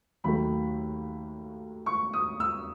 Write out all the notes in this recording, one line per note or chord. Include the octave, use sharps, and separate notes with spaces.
D#2 D#3 F#3 A3 B5
C#6
D#6
E6